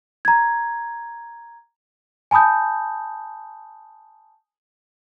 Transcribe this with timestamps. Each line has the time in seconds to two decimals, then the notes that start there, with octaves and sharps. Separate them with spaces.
0.25 A#5 G#6
2.31 G#5 A5 B5 D#6 G6